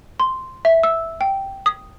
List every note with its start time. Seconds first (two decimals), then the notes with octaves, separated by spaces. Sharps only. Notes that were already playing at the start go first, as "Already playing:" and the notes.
0.20 C6
0.65 E5
0.83 E6
1.21 G5
1.66 D#6